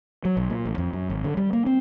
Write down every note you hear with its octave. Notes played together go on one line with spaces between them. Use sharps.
F#3
B1
A#2
A1
F2
F#2
G#1
D3
G3
A#3
C4